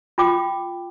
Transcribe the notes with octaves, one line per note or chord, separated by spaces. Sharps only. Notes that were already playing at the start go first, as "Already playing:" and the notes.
F4 G5 D6